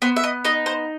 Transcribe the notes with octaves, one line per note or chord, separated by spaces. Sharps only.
B3 C5
E5
D#5
D#4 D#5
C5